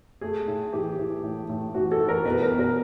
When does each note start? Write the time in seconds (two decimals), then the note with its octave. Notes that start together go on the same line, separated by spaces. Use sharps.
0.21 A3 G#4
0.48 A2
0.73 E3 G4
0.99 E3
1.23 A2
1.49 A2
1.74 E3 F#4
1.92 A4
2.00 E3
2.08 A#4
2.25 B2 B4
2.43 A#4
2.52 B2
2.59 A#4